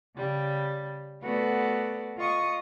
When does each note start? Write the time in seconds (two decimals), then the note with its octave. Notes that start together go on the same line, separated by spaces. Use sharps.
0.15 C#3 G3
1.22 A3 B3 F#4 A4 B4 D5
2.17 F4 D#5 C#6 D#6